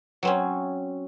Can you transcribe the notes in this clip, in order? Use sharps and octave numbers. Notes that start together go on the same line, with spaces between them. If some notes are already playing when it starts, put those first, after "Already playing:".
F#3 C4 C#4